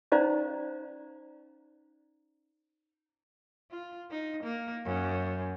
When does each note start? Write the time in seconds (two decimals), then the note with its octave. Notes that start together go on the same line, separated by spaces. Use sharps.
0.12 C#4 D#4 C5 D5 F5 A#5
3.71 F4
4.11 D#4
4.44 A#3
4.85 F#2